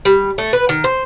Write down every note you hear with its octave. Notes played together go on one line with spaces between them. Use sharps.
G3
A3
B4
D#3
C5